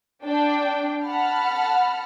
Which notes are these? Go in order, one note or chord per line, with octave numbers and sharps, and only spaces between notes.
D4 G5
F#5 A5 B5 F6